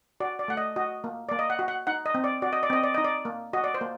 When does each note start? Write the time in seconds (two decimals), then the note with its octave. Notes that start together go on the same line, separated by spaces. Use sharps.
0.20 F#4 D5
0.39 D5
0.48 A3 F#5
0.57 D#5
0.76 F#4 D#5
1.04 A#3
1.29 A#3 D5
1.39 D#5
1.50 F#5
1.59 F#4
1.68 F#5
1.87 D#4 F#5
2.06 D#5
2.15 C4
2.24 D5
2.42 F#4 D5
2.53 D#5
2.63 D5
2.70 C4 D#5
2.84 D5
2.94 D#4 D#5
3.04 D5
3.25 A#3
3.53 F#4 D#5
3.64 D5
3.74 C5
3.81 A#3